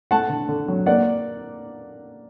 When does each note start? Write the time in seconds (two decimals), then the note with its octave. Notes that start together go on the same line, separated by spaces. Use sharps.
0.11 A3 F#5 A5
0.29 D3
0.49 D3
0.68 F#3
0.86 A#3 D5 F#5